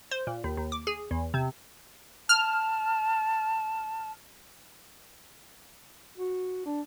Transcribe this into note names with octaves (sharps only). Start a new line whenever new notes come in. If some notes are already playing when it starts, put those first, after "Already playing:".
C5
A#2
D#2
D#2
D6
G#4
E2
C3
A5 F6
F#4
D4